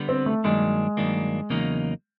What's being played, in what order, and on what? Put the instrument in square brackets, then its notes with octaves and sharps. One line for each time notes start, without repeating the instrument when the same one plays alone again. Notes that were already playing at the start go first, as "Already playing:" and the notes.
Already playing: [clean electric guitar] D3 G3 B3
[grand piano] C4
A3
[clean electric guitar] G2 D#3 F#3 A#3 D4 [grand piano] G#3
[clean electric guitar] G2 D#3 F#3 A#3 D4
E2 C#3 F#3 A#3 D#4